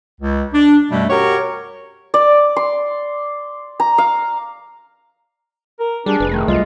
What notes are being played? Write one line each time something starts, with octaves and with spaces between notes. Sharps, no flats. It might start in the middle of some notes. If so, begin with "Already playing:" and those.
C#2
D4
F#2 B2 G3 A3
F#4 G4 A#4 C#5
D5
C6
A#5
F5
A#4
G3 D4 G#4
F1 B4
D#3 A3
C2 F#3 G3 F4 D#5